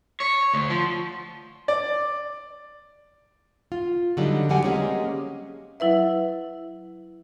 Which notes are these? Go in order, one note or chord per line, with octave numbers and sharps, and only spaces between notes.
C#5
D2
F3
D5
F4
D3 F#3 G3 D4 D#4
E2 D3 F#3 G3 F#5 G#5
G#3 A#3 C4 C#4 G4 G#4
F#3 E4 B4 E5